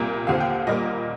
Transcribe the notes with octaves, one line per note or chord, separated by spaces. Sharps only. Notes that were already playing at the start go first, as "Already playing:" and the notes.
Already playing: C2 A#2 G3 A#3
D#2 D3 F3 C4 F5
G5
A#2 G3 A#3 D#5